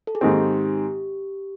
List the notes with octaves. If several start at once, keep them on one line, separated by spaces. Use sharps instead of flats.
A4
G#4
G#2 D#3 G#3 C4 G4